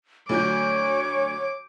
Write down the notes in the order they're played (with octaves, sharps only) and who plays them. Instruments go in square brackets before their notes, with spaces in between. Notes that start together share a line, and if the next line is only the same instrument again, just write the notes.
[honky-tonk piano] D2 F#3 G6 [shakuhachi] C#5 [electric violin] D6